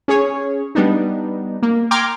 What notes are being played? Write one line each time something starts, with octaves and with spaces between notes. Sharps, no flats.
C#4 G#4 C#5
G3 B3 D4 D#4
A#3
G5 A#5 C6 D6 F6 G#6